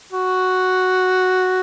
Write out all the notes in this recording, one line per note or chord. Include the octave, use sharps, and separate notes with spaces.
F#4